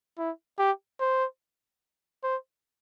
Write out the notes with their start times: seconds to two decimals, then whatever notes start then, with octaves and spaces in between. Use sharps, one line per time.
0.18 E4
0.59 G4
1.00 C5
2.24 C5